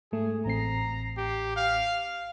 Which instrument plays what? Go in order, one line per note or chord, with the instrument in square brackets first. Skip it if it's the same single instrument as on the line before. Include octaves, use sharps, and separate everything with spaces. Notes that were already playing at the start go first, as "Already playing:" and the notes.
[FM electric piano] G#2 A3 [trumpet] G#4
[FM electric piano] A1 C4 C7 [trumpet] A#5
[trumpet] G4
F5